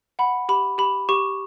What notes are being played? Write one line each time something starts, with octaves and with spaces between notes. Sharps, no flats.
F#5 B5
G4 B5
G4 B5
G4 C#6